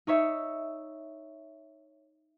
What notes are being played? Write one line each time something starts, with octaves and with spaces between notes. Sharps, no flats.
D#4 C#5 E5